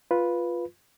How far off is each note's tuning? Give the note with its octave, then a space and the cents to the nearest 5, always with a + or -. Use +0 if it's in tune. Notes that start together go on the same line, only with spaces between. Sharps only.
F4 +0 B4 -5